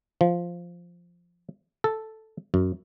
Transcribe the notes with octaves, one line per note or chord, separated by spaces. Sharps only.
F3
A4
F#2